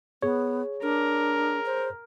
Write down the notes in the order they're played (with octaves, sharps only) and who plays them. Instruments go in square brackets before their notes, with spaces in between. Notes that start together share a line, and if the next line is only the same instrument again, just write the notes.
[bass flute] B3 [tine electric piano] G#4 C#5
[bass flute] D4 [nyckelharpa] A#4
[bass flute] C5